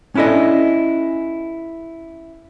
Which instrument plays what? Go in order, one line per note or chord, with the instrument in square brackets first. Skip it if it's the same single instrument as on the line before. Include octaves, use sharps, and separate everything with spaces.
[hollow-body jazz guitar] C#4 D4 E4 A4 D#5